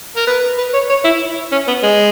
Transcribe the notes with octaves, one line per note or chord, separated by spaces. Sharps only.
A#4
B4
B4
C#5
C#5
E4
C#4
B3
G#3